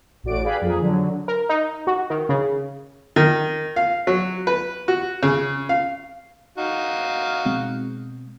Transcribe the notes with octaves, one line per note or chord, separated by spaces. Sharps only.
A1 A2 F#4 D5 D7
G4 G#4 B4 D5 F5 B5
F2 A#3 G#4
D3 F#3
A#4
D#4
F#4
D#3
C#3
D#3
F5
F#3
B4
F#4
C#3
F5
D#4 F#4 F5
B2 G#3 C4